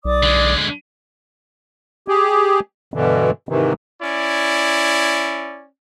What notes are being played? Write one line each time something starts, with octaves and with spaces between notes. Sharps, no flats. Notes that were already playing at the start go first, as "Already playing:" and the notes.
B1 D5 D6 D#6
D3 G#3
G4 G#4
G2 B2 D3 E3
G#2 C3 D#3 E3
C#4 E4 D5